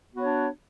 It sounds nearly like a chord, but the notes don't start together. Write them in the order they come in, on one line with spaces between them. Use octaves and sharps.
B3 F#4 C#5 D4